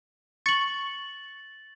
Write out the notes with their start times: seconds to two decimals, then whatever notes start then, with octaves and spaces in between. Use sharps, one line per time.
0.46 C#6 A6 F#7